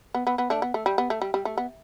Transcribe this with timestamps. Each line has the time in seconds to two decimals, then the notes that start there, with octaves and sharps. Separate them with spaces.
0.14 B3
0.27 B3
0.38 B3
0.50 A3 D4
0.62 B3
0.74 A3
0.86 G3
0.98 B3
1.10 A3
1.22 G3
1.34 G3
1.45 A3
1.58 B3